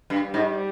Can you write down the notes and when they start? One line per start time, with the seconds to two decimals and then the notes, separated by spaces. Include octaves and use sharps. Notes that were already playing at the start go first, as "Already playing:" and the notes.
0.10 G2
0.22 G3
0.34 G#2